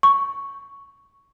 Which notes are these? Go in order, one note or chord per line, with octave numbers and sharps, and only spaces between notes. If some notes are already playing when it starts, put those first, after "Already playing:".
C#6